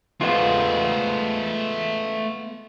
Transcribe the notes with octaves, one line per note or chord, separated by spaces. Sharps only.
G#3 A3 B3 F4 C5